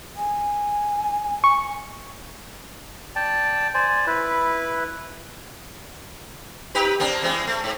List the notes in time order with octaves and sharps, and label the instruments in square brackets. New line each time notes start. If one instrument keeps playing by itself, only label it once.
[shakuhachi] G#5
[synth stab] C#6
[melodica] D5 G5 A5
C5 D5 G#5
E4 B4
[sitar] D#4 G4 B4
A#3 C4 D4
E3 G#3 C4
A3
G#2